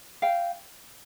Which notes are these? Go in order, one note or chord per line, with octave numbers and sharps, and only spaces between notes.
F5 G5